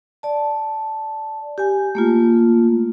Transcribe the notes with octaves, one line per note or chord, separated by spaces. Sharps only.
D5 A5
G4 G#5
A3 A#3 F4